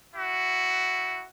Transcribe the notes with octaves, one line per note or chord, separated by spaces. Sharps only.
E4 F#4